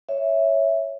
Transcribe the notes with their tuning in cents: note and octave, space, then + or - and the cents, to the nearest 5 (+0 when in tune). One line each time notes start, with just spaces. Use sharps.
C#5 +0 E5 +0